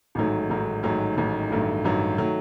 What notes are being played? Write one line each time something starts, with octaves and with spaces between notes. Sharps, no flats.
A1 G#2 D#3 F#3 A3
A1 G#2 D#3 F#3 A3
A1 G#2 D#3 F#3 A3
A1 G#2 D#3 F#3 A3
A1 G2 D#3 F#3 A3
A1 G2 D#3 F#3 A3
D#3 F#3 A3